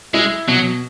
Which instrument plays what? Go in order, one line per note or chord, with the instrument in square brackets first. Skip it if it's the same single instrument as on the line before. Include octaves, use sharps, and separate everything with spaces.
[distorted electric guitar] G#3 [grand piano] E4
[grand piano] B2 [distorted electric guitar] F#3